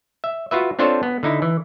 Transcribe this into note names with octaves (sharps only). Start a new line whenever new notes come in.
E5
F4 F#4 B4 E5
C4 D4 F4 A4 C5 C#5
B3
D3 D#4 E4
E3